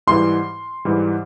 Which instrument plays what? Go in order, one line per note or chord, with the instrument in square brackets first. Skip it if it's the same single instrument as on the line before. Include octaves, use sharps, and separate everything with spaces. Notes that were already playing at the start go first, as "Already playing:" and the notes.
[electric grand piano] G#2 E3 G3 [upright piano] C6
[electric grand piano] G#2 E3 G3